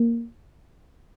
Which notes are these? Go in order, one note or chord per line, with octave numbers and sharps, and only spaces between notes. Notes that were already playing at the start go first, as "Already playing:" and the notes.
Already playing: A#3